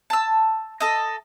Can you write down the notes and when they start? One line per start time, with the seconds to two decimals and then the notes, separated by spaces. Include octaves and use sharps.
0.10 A5 E6
0.80 A4 D#5